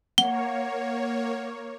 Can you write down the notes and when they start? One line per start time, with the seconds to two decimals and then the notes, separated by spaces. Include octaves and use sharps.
0.18 A#3 C#5 F#5 G7